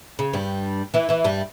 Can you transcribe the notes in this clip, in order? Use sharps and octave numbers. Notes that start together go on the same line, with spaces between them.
C#3
G2 G3
E3 E4
E3 E4
G2 G3